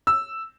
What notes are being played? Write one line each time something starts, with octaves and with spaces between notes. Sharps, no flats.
E6